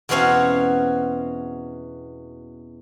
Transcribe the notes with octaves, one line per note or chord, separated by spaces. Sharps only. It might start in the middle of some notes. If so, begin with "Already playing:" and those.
E2 B2 C4 C#4 F#4 F5